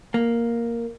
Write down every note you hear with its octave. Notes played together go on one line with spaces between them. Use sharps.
A#3